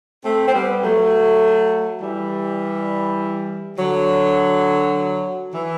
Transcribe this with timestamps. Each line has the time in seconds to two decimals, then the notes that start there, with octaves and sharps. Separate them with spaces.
0.24 A3 C4
0.47 C4
0.53 G3 B3
0.83 F#3 A3
2.00 E3 G3
3.77 D3 F#3
5.54 E3